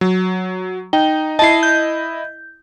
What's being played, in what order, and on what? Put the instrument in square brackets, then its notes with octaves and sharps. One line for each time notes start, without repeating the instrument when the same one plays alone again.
[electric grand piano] F#3
[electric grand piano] D#4 [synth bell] G5
[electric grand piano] E4 D#5 [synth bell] A5 C7
[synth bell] G6